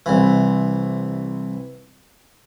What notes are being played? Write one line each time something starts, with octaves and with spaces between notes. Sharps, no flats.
C2 E3